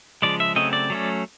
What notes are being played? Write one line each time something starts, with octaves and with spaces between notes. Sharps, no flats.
C#3 F3 G#3 D5
E5
C#3 F#3 A3 C4 D#5
D5
F#3 A3 C#4